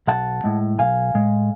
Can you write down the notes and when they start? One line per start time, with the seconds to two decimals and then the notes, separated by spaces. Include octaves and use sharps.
0.07 B1 F#5 A5
0.44 A2 G#3
0.78 B1 F5 G#5
1.14 A2 G#3